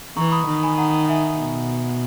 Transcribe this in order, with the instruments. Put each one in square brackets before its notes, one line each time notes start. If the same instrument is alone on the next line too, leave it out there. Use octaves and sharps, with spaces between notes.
[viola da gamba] E3 [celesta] A#5 C#6
[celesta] B5 D#6
[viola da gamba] D#3
[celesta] G#5 B5
F#5 A#5
E5 G#5
[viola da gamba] B2